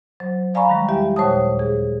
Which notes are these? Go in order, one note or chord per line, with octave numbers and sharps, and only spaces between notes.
F#3 C5
D5 F5 G#5 A#5 B5 C#6
D#3 G3 G#3
E2 G4 E5 G5
D#2 A#2 C5 C#5 A5 D#6
G#4